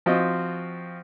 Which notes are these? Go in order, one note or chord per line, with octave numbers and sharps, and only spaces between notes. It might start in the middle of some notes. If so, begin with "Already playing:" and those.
F3 C4 F4 F#4 D#5